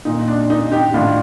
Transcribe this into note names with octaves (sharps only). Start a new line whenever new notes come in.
A#2 D#4
D4
D#4
D#4 G4
A2 D4 F4